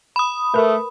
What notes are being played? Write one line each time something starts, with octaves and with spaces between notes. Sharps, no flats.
B5 D#6
A3 A#4 B4